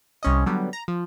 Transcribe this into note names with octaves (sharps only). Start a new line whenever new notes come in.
C2 C#4 D#5
D3 F#3 G3 B3
A#5
F3